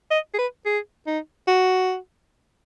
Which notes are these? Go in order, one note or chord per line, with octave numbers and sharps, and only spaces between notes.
D#5
G#4
B4
G#4
D#4
F#4